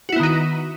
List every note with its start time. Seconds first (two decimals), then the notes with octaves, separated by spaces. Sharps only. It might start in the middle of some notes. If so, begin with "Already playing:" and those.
0.09 F#4
0.12 E4
0.16 B3
0.20 D#3
0.23 D#4